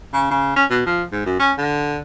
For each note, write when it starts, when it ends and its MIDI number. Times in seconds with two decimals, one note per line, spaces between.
0.13 0.26 49
0.31 0.55 49
0.56 0.65 61
0.70 0.82 47
0.86 1.03 53
1.12 1.22 44
1.26 1.36 42
1.40 1.52 61
1.58 1.99 50